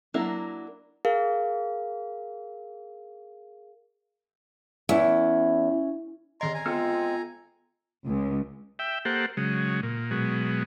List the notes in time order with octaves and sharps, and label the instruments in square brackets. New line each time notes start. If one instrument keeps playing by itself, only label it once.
[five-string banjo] F#3 A#3 D4 E4 A#4
[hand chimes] G#4 A#4 F5
[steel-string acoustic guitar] E2 [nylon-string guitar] C#4 E4 E5
[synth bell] D3 D#3 D#5 [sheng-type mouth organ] A#5 C6
[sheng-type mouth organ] G#5 A#5
[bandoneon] G#3 C4 [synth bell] B3 [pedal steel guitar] F4 A4 F6
[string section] C#2
[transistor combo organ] E5 G5
A#3 G4 A4 C5 F#5
C#3 F#3 G#3
A#2
B2 F#3 G#3